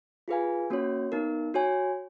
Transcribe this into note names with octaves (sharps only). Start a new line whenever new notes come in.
F4 G#4 B4 F5 G#5
A#3 C#4 F#4 C#5
B3 D#4 A#4
F#4 C#5 G#5